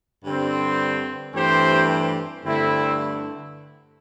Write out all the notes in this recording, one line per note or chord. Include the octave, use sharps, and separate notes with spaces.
G2 D3 G3 C4
G2 E3 A3 C4 G4 C5
G2 D3 A3 C4 E4